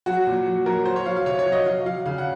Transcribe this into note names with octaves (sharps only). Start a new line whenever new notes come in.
F#3 F#4
A#2
F#3
F#3 A#4
F#3 C5
C#5
F#3 F5
F5
C3 C#5
C#5
F#3
D#5
F#3 F5
F#3 F5
C#3 F5
F#5